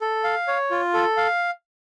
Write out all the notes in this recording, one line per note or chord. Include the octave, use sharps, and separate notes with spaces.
A4
F5
C#5
F4
A4
F5